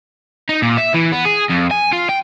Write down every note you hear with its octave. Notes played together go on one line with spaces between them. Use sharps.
D#4
A#2
E5
E3
B3
G#4
F2
G#5
F4
G5